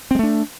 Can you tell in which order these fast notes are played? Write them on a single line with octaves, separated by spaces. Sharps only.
C4 G#3 A3 D4